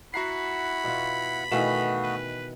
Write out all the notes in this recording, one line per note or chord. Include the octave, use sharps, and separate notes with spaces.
E4 F#4 F#5 A#5 B5 C7
B2 F4
B2 D#3 E3 A3 B3 F#4 F5 E7
B4